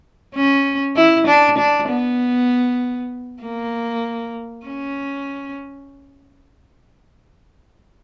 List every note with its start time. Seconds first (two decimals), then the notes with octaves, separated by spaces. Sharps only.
0.35 C#4
0.96 E4
1.27 D4
1.58 D4
1.89 B3
3.43 A#3
4.66 C#4